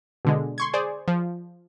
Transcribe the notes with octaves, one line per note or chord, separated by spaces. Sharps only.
B2 D3 G#3
C6 C#6 G#6
G#4 C5 D5
F3